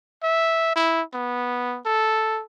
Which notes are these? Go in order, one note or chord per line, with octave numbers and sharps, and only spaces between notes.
E5
E4
B3
A4